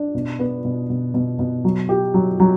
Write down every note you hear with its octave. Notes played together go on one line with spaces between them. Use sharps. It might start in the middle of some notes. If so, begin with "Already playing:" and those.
Already playing: D4
B2
B3
B2
B2
B2
B2
F#3
G4
F#3
F#3